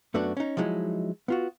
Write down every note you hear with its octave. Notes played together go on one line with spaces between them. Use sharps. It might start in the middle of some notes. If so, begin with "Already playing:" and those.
F#2 A3 B3 D4 F#4
C#4 D#4
F3 F#3 G#3 D#4 E4
B3 F4 F#4